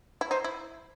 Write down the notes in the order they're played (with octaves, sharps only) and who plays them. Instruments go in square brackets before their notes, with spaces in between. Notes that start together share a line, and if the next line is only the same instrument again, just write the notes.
[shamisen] E4
[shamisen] D#4 [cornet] C5
[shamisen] E4